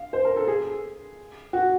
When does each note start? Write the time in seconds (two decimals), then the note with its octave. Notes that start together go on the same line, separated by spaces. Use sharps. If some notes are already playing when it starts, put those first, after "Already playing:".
Already playing: F5
0.13 C5
0.25 A#4
0.36 A4
0.48 G#4
1.53 F#4